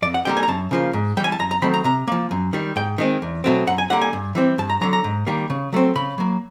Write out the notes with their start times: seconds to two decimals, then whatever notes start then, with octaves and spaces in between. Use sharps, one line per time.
0.02 F2 D5
0.14 F#5
0.25 D3 G3 A#3 G5
0.37 G#5
0.43 A#5
0.48 F#2 A5
0.71 C#3 F3 A#3
0.93 G#2
1.17 G3 G5
1.20 E3 G#5
1.32 A5
1.39 F#2 A#5
1.51 A#5
1.62 D#3 F#3 A3 C4 B5
1.74 A#5
1.84 C3 A#5
2.08 F3 A#3
2.31 F#2
2.53 D#3 G3
2.76 G#2 G5
2.98 D#3 G#3 C4
3.22 E2
3.44 B2 F#3 A3 C4
3.67 F#2 F#5
3.78 G#5
3.90 D3 G3 A#3 F#5
4.01 G#5
4.13 G2
4.35 E3 G3 C4
4.58 G2 A5
4.70 A#5
4.81 D3 F#3 A#5
4.93 A#5
5.04 G#2
5.27 D#3 G3 A#3
5.50 C#3
5.73 F#3 A3 C4
5.95 C#3 B5
6.18 F#3 A#3